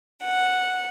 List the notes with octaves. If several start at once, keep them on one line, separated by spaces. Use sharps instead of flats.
F#5